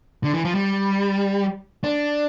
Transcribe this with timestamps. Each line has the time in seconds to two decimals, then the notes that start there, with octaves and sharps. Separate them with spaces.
0.24 D3
0.34 E3
0.45 F3
0.55 G3
1.84 D4